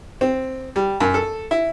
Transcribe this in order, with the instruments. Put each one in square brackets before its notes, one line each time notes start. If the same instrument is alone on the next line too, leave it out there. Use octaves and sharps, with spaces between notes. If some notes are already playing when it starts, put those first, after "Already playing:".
[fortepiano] C4
G3
F#2
A4
E4